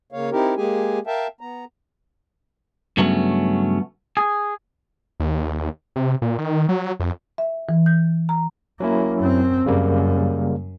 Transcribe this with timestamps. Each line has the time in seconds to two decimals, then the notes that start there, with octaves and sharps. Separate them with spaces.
0.12 C#3 A#3 C#5 F5
0.32 C4 D#4 E4 G4 A#4
0.57 G#3 A#3 G4 G#4 G#5
1.07 A#4 E5 F5 G5 A5
1.41 B3 A#5
2.97 G2 C#3 F#3 A3 B3 C#4
4.17 G#4
5.20 D#2
5.96 C3
6.22 A#2
6.38 D#3
6.69 F#3
7.00 F2
7.38 E5
7.69 E3
7.86 G6
8.29 A#5
8.80 F#3 A#3 C#4 E4
9.19 F#2 C4
9.66 F#2 C#3 G3 A#3